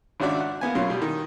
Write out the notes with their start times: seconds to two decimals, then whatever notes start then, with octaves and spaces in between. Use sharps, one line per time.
0.20 G#1 C#3 D4 F#4 D5 E5
0.40 F#5
0.61 A#3 B3 G#5
0.75 F#2 B2 C#4 F4 C6
0.90 B2 G3
1.02 D#3